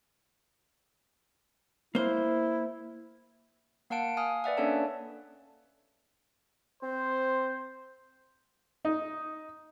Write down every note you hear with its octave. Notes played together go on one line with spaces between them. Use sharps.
A#3 E4 C5
A#3 F5 F#5 A5 D7
F5 G#5 D#6 F6
B4 D5 E5 F#5
A#3 C#4 D4 A4 C#5 A5
C4 C5
D#4